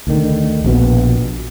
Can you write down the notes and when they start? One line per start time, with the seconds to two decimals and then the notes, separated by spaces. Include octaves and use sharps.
0.07 D2 D3 D#3
0.64 A#1 B2 B3